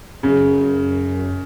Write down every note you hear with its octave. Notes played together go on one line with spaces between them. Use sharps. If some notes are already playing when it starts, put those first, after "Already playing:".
F#2 C#3